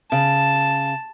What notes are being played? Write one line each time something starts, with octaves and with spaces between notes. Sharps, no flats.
C#3 A5